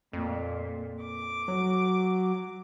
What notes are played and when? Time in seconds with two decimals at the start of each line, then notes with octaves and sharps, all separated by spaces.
0.13 F2 A#2
1.04 D6
1.48 F#3